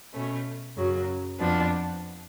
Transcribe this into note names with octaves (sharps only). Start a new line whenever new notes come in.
B2 A3 C#4
F#2 C#3 F#3
F2 F3 B3 D4